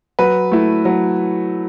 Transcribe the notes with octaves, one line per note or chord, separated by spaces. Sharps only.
F#3 B4
A3 E4
F#3